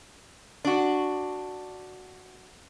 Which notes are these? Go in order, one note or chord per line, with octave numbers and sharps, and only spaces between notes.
D4 F#4